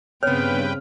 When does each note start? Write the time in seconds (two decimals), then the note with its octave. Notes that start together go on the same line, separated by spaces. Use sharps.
0.23 G2 C#3 B3 C4 B4 C#5 G5 F6